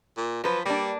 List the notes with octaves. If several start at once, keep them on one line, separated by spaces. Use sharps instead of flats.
A#2
F3 F#3 B4
G3 A#3 D4